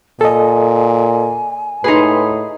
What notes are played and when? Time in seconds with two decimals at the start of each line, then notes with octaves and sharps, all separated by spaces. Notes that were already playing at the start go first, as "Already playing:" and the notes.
0.21 A#2 A4 D#5 G#5
1.84 A2 D#4 G#4 B4 B5 C6